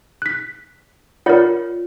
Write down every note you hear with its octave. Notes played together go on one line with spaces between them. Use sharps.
F#6 B6
F4 A#4 C#5 D5 F#5